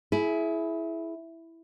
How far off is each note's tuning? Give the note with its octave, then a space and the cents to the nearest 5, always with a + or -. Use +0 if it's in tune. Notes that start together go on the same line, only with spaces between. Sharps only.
E4 +0 G#4 +25